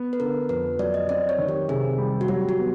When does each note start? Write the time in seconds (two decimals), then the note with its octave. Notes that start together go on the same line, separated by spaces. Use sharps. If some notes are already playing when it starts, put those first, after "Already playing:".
Already playing: B3
0.13 B4
0.20 D3 A#4
0.49 F2 B4
0.79 F#3 D5
0.94 D#5
1.09 C4 D5
1.29 C#5
1.38 D#3
1.49 G4
1.69 C3 G#4
1.98 G3
2.21 F#4
2.28 F#3 G4
2.49 F#4
2.59 B3